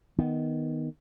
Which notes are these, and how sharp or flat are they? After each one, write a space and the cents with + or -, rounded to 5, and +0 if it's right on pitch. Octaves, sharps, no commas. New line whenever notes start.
D#3 +0 B3 +0